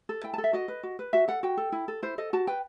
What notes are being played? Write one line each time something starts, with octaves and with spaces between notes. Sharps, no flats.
A4
E4 G5
A5
A4
E5
F#4 D#5
B4
F#4
B4
F#4 E5
A4 F#5
F#4 G5
A4
E4
A4
E4 C5
A4 D#5
F#4 A5
B4 G5